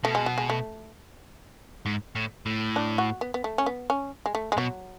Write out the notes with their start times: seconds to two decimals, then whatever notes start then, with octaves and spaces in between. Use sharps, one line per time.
0.04 B2 A3
0.15 G#3
0.26 F#3
0.38 G#3
0.50 A3
1.86 G#2
2.15 A2
2.46 A2
2.76 D4
2.98 F#4
3.21 B3
3.34 B3
3.44 A3
3.58 C#4
3.66 B3
3.90 C#4
4.26 G#3
4.35 A3
4.52 G#3
4.57 B2 F#3